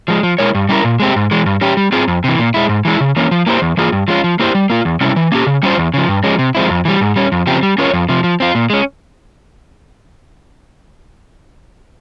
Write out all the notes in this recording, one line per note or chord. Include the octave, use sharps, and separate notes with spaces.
F3 G#3
F3
G#3 E4 A#4 C#5
G2
G3 C#4 E4 A#4
A#2
G#3 C4 G4
G#2
E3 G#3
G2
G3 C#4 G4
G3
C4 F4 G#4
F2
C3 E3
A#2
G#3 E4
G#2
E3 G#3 E4
C#3
E3 A#3 C#4
F3
A#3 E4 G4 C5
E2
E3 A#3 F4 G#4
G2
F3 G#3 C#4 F4
F3
A#3 E4 G4 C5
G3
A#3 F4
E2
C3 G3 C#4 E4
E3
A#3 C#4 G4
C#3
G3 C#4 F4 C5
E2
C#3 F3
G2
F3 G#3 C#4
C3
F3 G#3 C4 E4
F2
E3 G3
G#2
G3 C#4
F2
C#3 F3 C4 G4
G3
C#4 F4 A#4 C#5
F2
C3 F3
F3
C4 F4
A#2
G#3 C#4